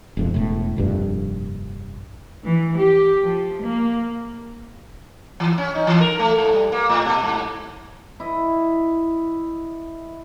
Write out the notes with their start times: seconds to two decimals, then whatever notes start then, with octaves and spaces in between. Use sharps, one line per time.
0.17 E1 F2 C3
0.34 E1 A2
0.77 F1 A#1 G2
2.44 E3
2.76 G4
3.22 F3
3.62 A#3
5.40 E3
5.58 C#4
5.75 D#4
5.87 E3
6.01 A#4
6.19 A3
6.38 G#2
6.53 G3
6.72 A#3
6.89 A2
7.06 B2
7.23 G#2
8.20 E4 D#5